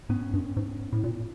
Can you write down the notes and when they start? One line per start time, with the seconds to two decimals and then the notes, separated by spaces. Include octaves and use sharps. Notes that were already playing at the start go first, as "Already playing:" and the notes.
0.09 G#2 B3 C#4
0.34 G2
0.57 G#2
0.92 A2
1.04 A#2